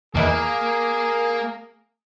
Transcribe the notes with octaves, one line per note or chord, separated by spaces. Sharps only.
E2 D#3 E3 A#3 G#4